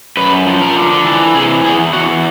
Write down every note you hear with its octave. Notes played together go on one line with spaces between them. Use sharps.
F#2 B4
F3
A#4
D3
E3 A4
C3 G#4
E2 G#4
E2 F#4